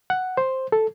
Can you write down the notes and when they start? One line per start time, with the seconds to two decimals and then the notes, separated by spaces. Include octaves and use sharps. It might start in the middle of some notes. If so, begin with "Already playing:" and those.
0.10 F#5
0.37 C5
0.72 A4